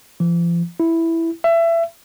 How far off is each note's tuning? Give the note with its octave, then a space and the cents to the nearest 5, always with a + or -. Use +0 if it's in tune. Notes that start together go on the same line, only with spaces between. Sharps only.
F3 -40
E4 +0
E5 +25